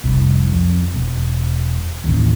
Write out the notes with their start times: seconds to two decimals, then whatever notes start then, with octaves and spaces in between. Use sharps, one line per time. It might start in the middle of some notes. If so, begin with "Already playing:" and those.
0.04 F1 C2
0.50 F2
0.94 E1
2.04 A1 D#2